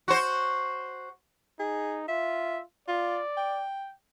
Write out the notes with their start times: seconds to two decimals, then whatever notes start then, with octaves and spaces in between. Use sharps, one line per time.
0.08 F#4 C5
1.60 D#4 G#4
2.08 F4 E5
2.88 F4 D5
3.37 G5